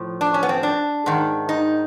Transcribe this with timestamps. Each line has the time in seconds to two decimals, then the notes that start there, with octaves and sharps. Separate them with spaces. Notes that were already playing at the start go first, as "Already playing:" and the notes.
Already playing: A2 F3
0.21 D4
0.34 C#4
0.43 B3
0.49 C4
0.63 D4
1.06 G#2 D#3
1.49 D#4